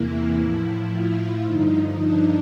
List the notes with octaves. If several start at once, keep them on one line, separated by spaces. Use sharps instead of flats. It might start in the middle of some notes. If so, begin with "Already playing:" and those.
Already playing: E2 C3 E3 A#3 E4
A2 F3
F4
G2 D3 F3 D#4
D4